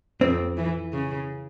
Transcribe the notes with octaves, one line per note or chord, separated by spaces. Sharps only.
F2 C4
E3
C#3